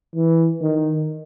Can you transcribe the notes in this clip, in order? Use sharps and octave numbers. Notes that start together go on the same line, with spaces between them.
E3
D#3